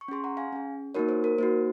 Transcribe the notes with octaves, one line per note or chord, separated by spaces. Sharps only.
C#6
C#4 G#4 C6
F#5 A#5
F5 G#5
C#4 G#4
A#3 D#4 F#4 A#4 C#5
C5
A#4
A#3 D#4 F#4 C5